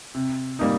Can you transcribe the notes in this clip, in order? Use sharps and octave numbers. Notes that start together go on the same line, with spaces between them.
C3
G3 A#3 D#4